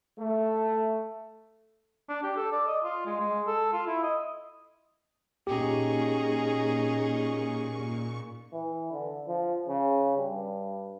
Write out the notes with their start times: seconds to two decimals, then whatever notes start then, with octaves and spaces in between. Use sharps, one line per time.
0.18 A3
2.09 D4
2.23 G4
2.36 A4
2.52 D5
2.67 D#5
2.84 F4
3.06 G#3
3.19 G#3
3.47 A4
3.73 F4
3.87 E4
4.03 D#5
5.47 A#2 C#4 D#4 G4 G#4 C#6
8.53 E3
8.92 D3
9.28 F3
9.68 C#3
10.17 G2